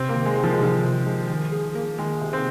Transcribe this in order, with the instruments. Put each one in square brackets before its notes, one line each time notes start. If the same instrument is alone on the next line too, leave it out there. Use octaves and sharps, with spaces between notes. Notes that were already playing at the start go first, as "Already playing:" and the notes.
Already playing: [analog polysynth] C3 [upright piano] C4
[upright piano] A#3
[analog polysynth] D#3
[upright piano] G#3
[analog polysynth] D#3
[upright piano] F3
G#3
[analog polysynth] C3 [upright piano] F3
[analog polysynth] C3
G#3
D#3
G#4
A#3
[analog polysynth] D#3 [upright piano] G#3
[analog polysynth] C3
[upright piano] C4